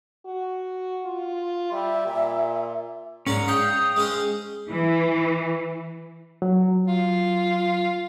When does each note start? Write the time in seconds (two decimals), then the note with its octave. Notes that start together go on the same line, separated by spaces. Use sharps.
0.26 F#4
1.05 F4
1.72 G3 E5
2.06 A#2
3.27 G#2 C#4 D5 A#5
3.48 C#5 F5 G5 D#6
3.96 G#3 C#4 C5
4.70 E3
6.42 F#3
6.88 F4